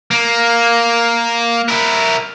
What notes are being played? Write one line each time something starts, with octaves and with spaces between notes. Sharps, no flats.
A#3
E4 A#4